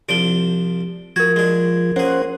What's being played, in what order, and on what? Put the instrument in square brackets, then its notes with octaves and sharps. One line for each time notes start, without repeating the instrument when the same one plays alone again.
[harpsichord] C2 F3 D4 [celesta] D7 G7
[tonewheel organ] F3 [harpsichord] F#4 [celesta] A#4 G#6
[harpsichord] G#3 D4
[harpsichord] A#3 G#4 [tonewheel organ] C#4 C5 F#5